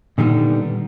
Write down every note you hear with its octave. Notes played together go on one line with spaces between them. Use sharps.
A#2 D3 D#3 G3 B3